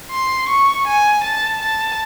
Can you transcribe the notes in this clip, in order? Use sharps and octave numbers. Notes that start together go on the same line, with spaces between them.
C6
C#6
G#5
A5
A5